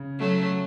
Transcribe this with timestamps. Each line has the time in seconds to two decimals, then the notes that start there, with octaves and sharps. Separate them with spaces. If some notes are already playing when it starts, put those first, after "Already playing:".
Already playing: C#3
0.19 F#3 A3